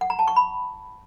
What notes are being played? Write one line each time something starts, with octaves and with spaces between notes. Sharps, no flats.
F#5
A#5
A5
C#6
B5